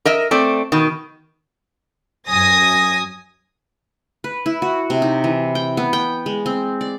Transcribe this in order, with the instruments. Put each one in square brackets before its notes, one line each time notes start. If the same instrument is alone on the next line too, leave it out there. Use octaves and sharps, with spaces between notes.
[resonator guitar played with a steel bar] A#4 D#5 E5
A3 C4 D5
B2 D#3
[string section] F#2 G#5 D#6 A#6
[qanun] B4
E4
F#4
C3
D#4
E3
G5
B3
G5
G#3
C4
D5